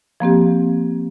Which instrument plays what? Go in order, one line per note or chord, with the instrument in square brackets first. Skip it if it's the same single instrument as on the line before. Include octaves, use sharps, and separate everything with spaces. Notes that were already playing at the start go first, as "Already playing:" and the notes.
[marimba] F3 A#3 C4 G4